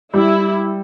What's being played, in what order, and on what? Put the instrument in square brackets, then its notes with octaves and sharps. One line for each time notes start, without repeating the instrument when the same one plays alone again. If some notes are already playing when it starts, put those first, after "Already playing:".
[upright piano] G3 [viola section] E4